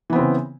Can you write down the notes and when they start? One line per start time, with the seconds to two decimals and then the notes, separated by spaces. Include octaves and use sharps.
0.10 E3
0.13 B3
0.16 C4
0.19 C#3